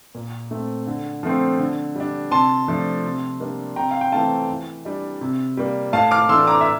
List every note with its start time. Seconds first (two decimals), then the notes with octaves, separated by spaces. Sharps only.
0.15 A#2
0.51 A3 C4
0.87 D3
1.23 F3 A3 C4
1.59 D3
1.96 G3 D4
2.31 C3 A5 C6
2.68 F3 A3 D4
3.04 C3
3.40 G3 A#3 D4
3.76 C3 G5 A#5
3.91 F5
4.01 G5
4.12 E3 A3 C4 F5 A5
4.49 E3
4.85 G3 D4
5.21 C3
5.57 G3 A#3
5.93 A2 F5 A5
6.11 D6 F6
6.29 E3 A3 D4 C6 E6
6.47 A#5 D6
6.61 E5